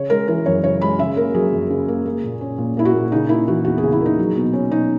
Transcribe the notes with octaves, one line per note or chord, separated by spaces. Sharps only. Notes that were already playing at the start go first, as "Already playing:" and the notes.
Already playing: C#3 C#5
G#3 A#4
E3 A#4
F#2 C#5
C#3 C#5
G#3 B5
C#3 E5
A#3 A#4
F#3 G#4
F#2
C#3
A#3
A#3
A#2
C#4
A#2
A#3 E4
F#4
A#2
C#3 D#4
A#3 E4
E3 F#4
E2 F#4
G#4
C#3
E4
A#3 D#4
F#3
B2
C#4
B2 D#4